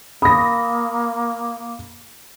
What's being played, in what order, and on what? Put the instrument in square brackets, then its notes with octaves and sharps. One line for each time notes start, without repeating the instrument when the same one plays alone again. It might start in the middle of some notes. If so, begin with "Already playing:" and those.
[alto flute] A#3 [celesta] B5 [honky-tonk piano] D#6 A#6